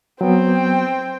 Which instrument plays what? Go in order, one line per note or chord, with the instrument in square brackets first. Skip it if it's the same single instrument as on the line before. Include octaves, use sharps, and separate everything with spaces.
[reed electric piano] F#3 B3 [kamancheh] C4 G5